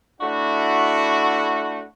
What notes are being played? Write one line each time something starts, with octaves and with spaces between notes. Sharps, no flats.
A3 D4 E4 F#4